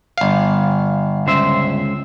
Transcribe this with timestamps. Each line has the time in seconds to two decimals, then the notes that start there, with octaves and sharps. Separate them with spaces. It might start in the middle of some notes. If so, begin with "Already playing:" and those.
0.18 G1 F5
1.27 C#2 C5 E5